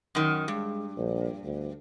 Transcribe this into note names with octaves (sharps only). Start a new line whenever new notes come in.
F#2 D#3
G2 G#3
A#1
D2